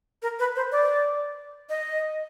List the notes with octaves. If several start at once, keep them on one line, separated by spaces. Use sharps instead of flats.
A#4
B4
C5
D5
D#5